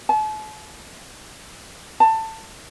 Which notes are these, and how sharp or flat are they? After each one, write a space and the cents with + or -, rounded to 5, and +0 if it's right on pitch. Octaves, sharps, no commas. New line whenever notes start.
A5 -40
A5 +20